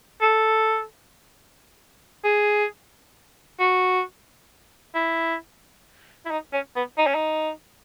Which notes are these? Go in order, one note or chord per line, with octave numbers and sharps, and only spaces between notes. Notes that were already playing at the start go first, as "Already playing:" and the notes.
A4
G#4
F#4
E4
E4
D#4
C#4
B3
D#4
C#4
D#4